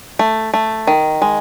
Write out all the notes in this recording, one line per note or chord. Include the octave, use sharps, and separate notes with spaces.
A3
A3
D#3
G#3